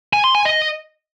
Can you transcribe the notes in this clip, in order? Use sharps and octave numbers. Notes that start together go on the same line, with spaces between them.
G#5
C6
G#5
D#5